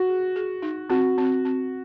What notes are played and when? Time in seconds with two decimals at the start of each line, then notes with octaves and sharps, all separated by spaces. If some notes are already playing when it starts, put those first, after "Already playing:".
Already playing: F#4
0.09 G#4
0.36 G#4
0.62 D#4
0.90 C4 F#4
1.18 C4
1.45 C4